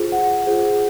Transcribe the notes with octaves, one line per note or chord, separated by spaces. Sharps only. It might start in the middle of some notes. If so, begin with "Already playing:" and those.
Already playing: F4 G#4 C5
F#5
F4 G#4 C5